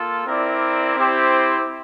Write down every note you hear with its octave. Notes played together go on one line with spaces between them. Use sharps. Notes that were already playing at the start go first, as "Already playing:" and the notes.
Already playing: A#3 F4 A4
C4 E4 A#4 D5
C4 E4 G4 C5